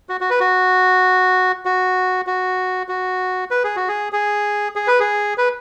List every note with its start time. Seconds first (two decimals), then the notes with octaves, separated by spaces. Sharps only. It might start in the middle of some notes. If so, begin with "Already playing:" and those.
0.09 F#4
0.21 F#4
0.30 B4
0.40 F#4
1.65 F#4
2.27 F#4
2.89 F#4
3.51 B4
3.64 G#4
3.76 F#4
3.88 G#4
4.13 G#4
4.76 G#4
4.87 B4
5.00 G#4
5.38 B4